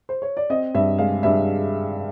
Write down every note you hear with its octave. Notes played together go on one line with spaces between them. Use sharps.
C5
C#5
D5
C4 D#5
G2 E5
G#3 F5
G2 E5